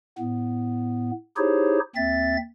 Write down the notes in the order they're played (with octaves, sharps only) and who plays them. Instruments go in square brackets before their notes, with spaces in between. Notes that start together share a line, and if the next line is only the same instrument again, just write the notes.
[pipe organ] A2 B3
D#4 E4 G4 G#4 C5 C#5
D#2 C4 E5 A6